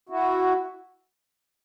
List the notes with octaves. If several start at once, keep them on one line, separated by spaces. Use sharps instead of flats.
E4 F#4